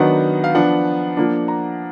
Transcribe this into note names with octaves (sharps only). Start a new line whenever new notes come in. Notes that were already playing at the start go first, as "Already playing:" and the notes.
Already playing: D#3 F#3 B3 D4 F#5
F5
F3 B3 D4 F#5
F3 A#3 D4
A#5